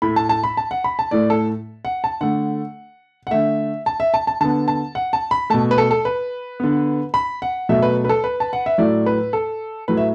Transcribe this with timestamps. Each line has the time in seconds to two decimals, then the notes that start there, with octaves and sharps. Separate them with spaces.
0.02 A2 A3 B5
0.16 A5
0.29 A5
0.44 B5
0.57 A5
0.71 F#5
0.84 B5
0.99 A5
1.11 A2 A3 D5
1.30 A4
1.85 F#5
2.04 A5
2.21 D3 A3 F#5
3.27 F#5
3.31 D3 A3 E5
3.86 A5
4.00 E5
4.14 A5
4.27 A5
4.41 D3 B3 A5
4.68 A5
4.95 F#5
5.13 A5
5.31 B5
5.50 B2 A3 A5
5.71 B4
5.78 A4
5.91 A4
6.05 B4
6.60 D3 B3
7.14 B5
7.42 F#5
7.69 B2 F#3 A3 E5
7.82 B4
8.04 B4
8.09 A4
8.24 B4
8.40 A5
8.53 F#5
8.66 E5
8.78 A2 F#3 A3 D5
9.06 B4
9.33 A4
9.88 A2 F#3 A3 B4
9.97 E5